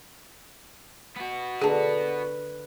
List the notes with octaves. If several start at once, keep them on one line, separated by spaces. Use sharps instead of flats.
B3 F#4
D3 A#3 G#4 B4 A5